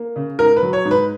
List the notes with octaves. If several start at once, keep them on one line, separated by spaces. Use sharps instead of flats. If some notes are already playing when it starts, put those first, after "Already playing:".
Already playing: A#3
C#3
G#2 A#4
B4
F#3
C#5
G#2
B4